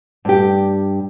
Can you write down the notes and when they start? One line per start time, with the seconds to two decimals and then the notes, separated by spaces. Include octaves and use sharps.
0.25 G2 G4